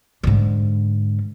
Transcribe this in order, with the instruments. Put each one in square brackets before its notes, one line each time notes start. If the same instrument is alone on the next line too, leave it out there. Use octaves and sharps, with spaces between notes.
[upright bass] G#2 D3